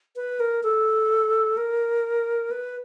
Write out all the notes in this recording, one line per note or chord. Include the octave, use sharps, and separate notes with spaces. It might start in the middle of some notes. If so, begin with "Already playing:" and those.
B4
A#4
A4
A#4
B4